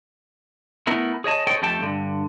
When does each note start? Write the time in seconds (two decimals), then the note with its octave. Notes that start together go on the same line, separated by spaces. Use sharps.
0.87 A3 B3 E4 A#4
1.24 G#4 C#5 D#5 A5
1.47 G#4 A4 C5 C#5 D#5 G5
1.62 F2 A3 G4 A4 G5 A5
1.81 G2 D3